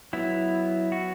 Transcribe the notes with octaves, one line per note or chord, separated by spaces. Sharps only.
F#3 B3 E4
F#4